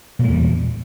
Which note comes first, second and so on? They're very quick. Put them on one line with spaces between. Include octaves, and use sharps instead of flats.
A#2 G#3 E2 G3